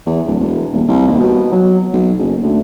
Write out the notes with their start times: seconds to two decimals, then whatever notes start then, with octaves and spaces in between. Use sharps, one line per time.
0.06 E2
0.26 D1
0.41 E1
0.73 D#1
0.88 C2
1.08 D#2
1.20 B2
1.52 F#3
1.93 B1
2.19 F#1
2.43 D2